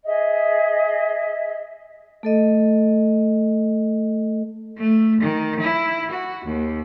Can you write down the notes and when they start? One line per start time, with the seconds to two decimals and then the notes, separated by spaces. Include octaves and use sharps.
0.05 G#4 D#5 E5
2.23 A3 A4 D#5
4.78 A3
5.21 D#3
5.60 E4
6.11 F#4
6.45 D#2